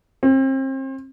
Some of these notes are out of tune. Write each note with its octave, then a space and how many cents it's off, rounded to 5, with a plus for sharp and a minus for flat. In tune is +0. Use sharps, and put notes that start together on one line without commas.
C4 +35